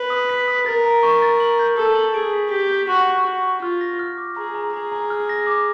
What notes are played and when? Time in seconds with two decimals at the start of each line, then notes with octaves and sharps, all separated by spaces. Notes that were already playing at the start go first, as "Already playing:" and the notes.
Already playing: B4
0.10 D#6
0.30 B6
0.48 D#6
0.66 A#4 A6
0.85 A#5
1.03 C#6
1.22 A6
1.40 F#7
1.59 G6
1.77 A4 G6
1.96 F#7
2.14 G#4 D7
2.33 B6
2.51 G4 B6
2.70 G6
2.89 F#4 C#6
3.07 C#6
3.25 F#4 C#6
3.44 C#6
3.62 F4 F6
3.81 A#6
3.99 F6
4.18 D6
4.36 G#4 A#5
4.55 A#5
4.73 G#4 A#5
4.92 A#5
5.10 F6
5.29 A#6
5.47 D6